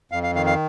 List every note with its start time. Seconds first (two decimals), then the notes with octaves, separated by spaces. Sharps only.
0.12 F2 F5
0.23 F5
0.35 D#3 F5
0.46 F5